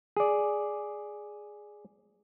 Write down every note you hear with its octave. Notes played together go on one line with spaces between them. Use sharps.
G#4 D5